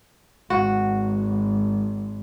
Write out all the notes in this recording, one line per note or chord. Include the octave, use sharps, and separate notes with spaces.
G#1 F#4